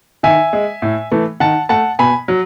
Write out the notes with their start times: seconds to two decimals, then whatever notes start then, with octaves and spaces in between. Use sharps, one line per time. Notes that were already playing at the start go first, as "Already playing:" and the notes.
0.23 D#3 E5 G#5
0.53 G#3
0.82 A2
1.12 E3 A3
1.40 D#3 F#5 A5
1.69 A3 F#5 A5
1.99 B2 G#5 B5
2.28 F#3